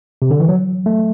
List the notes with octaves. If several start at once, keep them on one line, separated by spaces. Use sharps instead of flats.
C3
D3
E3
F#3
A3